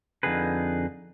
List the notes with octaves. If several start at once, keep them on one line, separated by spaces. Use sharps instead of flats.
F2 D3 D#4 G#4 B4